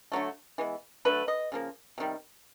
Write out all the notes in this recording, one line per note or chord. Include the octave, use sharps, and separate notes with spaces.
D3 F#3 A3
E3 G#3 B3
D3 F#3 A3 B4
D#5
C#3 F3 A#3
C3 D#3 G3